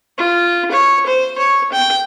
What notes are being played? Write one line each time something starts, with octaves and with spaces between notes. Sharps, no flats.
F4
C#5
C5
C#5
G5